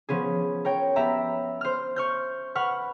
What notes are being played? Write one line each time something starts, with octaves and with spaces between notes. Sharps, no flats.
F3 B3 C#4 G#4
A#4 C#5 G5
B3 G4 E5 A#5
C5 F6
C#6 F6 G6
B4 F#5 C#6 F6